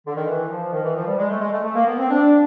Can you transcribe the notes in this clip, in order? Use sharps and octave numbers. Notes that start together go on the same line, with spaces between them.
D3
D#3
E3
F3
D#3
E3
F3
G3
G#3
A3
G#3
A3
A3
A#3
B3
C4
D4